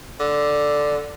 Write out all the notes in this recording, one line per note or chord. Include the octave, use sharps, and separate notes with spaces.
D3